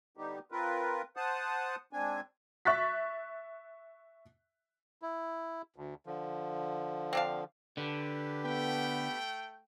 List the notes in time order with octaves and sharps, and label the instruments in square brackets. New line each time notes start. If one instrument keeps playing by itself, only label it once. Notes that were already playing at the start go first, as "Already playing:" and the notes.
[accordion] D3 G3 B3 D#4 G4
C4 F4 A#4 B4
C5 F#5 A5 D#6
G#2 C4 D4 G#5
[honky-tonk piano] E5 C#6 F#6 A6 B6
[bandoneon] E4
D2
D3 F3
[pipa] C4 D4 F5
[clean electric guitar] D3 [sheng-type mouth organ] G4 B4
[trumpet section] A3 G5 [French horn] B3